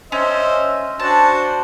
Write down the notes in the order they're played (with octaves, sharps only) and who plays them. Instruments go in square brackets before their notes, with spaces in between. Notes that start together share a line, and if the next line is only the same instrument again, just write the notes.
[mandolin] C#4 [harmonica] C5 D#5 E5
[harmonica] D4 F#4 C5 [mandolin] A5